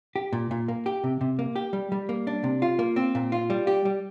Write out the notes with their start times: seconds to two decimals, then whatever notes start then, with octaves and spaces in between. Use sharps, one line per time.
0.16 G4
0.33 A#2
0.51 A#2
0.68 A#3
0.86 G4
1.04 C3
1.21 C3
1.39 A#3
1.56 G4
1.73 G3
1.92 G3
2.09 A#3
2.27 D4
2.44 C3
2.62 F4
2.79 A#3
2.96 C4
3.15 A#2
3.32 F4
3.50 G3
3.67 G4
3.85 G3